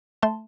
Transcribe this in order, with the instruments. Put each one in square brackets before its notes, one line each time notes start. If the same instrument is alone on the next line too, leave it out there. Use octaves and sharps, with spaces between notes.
[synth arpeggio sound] A3 A5 C6